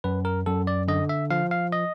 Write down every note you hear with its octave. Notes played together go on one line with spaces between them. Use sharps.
F#2 B4
A#4
F#2 A4
D5
D3 D#5
E5
F3 F5
F5
D#5